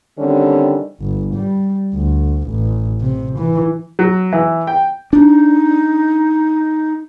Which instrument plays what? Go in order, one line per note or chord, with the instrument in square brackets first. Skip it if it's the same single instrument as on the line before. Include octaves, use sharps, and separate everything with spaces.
[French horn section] D3 D#3 G3 C4 C#4
[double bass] G1
G3
D2
A1
C3
E3
[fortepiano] F#3
E3
G5
[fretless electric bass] D4 [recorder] D#4